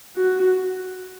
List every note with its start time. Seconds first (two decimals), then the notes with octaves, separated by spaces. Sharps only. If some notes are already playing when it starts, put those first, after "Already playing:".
0.16 F#4